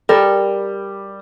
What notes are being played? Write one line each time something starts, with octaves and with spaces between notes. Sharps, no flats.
G3 A4 A#4